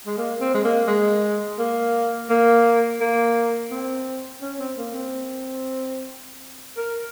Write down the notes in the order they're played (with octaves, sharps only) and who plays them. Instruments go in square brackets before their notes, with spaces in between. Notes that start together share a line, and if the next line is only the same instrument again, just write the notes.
[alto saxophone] G#3
A#3
C4
G#3
A#3
G#3
A#3
A#3
A#3
C4
C#4
C4
A#3
C4
A#4